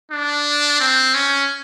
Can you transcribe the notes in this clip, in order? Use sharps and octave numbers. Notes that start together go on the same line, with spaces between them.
D4
C4
C#4